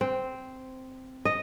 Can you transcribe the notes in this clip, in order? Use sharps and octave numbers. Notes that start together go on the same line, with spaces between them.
C4
D#5